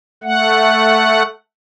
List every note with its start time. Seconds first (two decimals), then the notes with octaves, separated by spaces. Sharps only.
0.23 A3 F#5